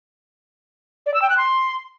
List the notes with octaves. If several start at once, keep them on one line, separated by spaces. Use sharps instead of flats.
D5
E6
G5
F#6
C6